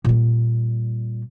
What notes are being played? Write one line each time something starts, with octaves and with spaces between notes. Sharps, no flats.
A#2 G3